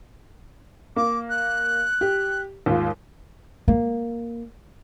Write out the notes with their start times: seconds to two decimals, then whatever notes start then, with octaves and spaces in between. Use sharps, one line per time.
0.96 A#3 D6
1.30 F#6
2.01 G4
2.66 D#2 G#2 F4
3.68 A#3